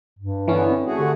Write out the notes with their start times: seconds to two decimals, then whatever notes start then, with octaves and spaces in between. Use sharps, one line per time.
0.19 G2
0.48 D3 E3 B3 C#4 E4
0.70 C4
0.86 A3 F#4 G#4
0.98 D3 G4